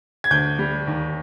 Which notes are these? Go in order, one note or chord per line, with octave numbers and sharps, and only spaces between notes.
G#6
D2 G6
G3
D#2